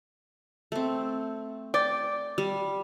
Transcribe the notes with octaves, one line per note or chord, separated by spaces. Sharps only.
A3 C4
D5 G5
G3